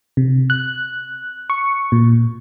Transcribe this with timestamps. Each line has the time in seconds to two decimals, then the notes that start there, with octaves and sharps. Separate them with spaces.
0.17 C3
0.50 F#6
1.50 C#6
1.92 A#2